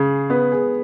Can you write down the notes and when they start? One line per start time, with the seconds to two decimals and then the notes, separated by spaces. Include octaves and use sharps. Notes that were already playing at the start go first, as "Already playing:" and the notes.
Already playing: C#3 G#4
0.30 B3 B4
0.52 G#4